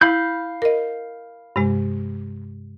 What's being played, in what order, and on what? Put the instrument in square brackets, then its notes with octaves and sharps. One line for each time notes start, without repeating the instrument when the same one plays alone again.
[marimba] E4 [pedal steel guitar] F5 B5 G6
[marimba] A#4 D#5
G2 C3 G#3